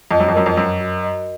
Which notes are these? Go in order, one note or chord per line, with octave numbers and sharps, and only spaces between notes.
F2 D#5
F#2
F2
F#2 A#4
F2
F#2 F#4
F#4
D#5